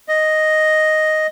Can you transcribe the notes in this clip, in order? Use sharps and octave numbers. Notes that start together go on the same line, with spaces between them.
D#5